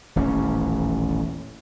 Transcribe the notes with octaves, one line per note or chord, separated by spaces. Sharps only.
D#1 A1 E2 C#4